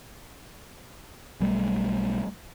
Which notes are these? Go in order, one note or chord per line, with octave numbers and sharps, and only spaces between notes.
B1 G3 A3